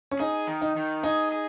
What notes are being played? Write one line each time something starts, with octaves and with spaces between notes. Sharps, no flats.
C#4
D#4 G#4
D#3
D#4
D#3
D#4 G#4
G#4